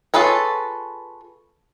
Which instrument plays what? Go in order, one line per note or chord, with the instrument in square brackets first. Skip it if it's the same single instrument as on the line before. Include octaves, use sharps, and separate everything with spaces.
[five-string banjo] F4 G#4 A4 B4 C#5